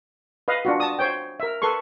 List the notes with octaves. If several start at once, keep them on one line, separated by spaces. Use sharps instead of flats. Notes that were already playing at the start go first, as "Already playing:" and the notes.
B4 D#5 F5
D4 F4 F#4
A5 D#6
C5 C#5 G5
A#4 E5
A4 B4 C6 C#6